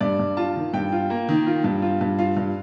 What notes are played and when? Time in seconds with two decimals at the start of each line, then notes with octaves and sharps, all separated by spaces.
0.01 G2 D5
0.20 G2
0.37 F4 A5
0.56 D#3
0.74 G2 G5
0.92 F4
1.10 A#3
1.29 D#3
1.46 F4
1.64 G2
1.82 F4
2.01 G2
2.19 F4 F5
2.37 G2